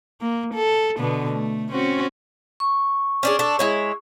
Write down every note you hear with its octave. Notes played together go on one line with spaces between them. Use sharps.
A#3
A4
B2 D3 B3
A3
C4 C#4 F#4
C#6
C#4 D4 G#4
D4 A4
G#3 E4 C#5